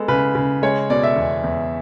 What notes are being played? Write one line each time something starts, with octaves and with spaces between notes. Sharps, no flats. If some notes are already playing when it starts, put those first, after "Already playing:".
Already playing: G#3 B3 A4
C#3 B4
C#3
G#3 C#5
B2 D5
E5
E2
E2